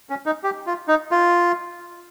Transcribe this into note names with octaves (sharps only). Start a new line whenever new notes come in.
C#4
D#4
G4
F4
D#4
F4